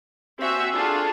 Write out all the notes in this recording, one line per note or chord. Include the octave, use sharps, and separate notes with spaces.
C4 F#4 E5 G#5
D4 F4 G#4 A4